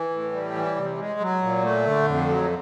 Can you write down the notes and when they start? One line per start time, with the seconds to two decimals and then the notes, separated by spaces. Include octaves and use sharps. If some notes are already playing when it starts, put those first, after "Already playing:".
Already playing: E3
0.10 A2
0.32 G3
0.55 E3
0.76 C3
0.98 G#3
1.20 F#3
1.42 A#2
1.63 A3
1.86 D3
2.07 F2
2.28 F#3